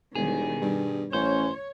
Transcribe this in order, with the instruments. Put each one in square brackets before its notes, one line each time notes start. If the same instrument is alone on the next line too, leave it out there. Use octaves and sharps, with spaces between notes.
[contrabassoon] E1 [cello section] B2 D#3 G3 [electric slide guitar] G#4
[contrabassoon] G2
[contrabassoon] A1 [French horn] C#4 [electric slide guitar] C5 [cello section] C#5